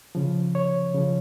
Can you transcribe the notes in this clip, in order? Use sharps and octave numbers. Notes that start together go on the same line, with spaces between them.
C#3 F3
C#5
C#3 F3